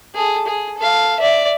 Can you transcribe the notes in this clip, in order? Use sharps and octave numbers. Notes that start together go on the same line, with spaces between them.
G#4 A4
G#4
A4 F5
D5 E5